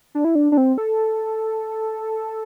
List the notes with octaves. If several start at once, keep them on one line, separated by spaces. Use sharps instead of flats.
D4
E4
D4
D4
C4
A4